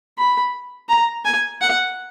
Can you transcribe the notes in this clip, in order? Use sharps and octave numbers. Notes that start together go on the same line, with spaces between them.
B5
A#5
G#5
F#5